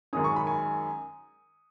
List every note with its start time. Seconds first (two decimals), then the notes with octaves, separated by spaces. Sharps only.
0.13 F#2 D#3 G#3 C#4 D#6
0.24 C#6
0.36 B5
0.47 G#5